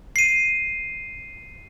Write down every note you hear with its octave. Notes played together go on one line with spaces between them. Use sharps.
C7 D#7